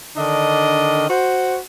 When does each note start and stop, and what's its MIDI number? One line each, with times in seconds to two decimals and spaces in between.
0.17 1.05 50
0.17 1.05 51
0.17 1.05 62
0.17 1.05 75
1.09 1.58 66
1.09 1.58 72